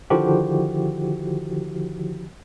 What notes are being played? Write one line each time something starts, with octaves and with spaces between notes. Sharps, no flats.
D3 D#3 F3 E4 F#4 G4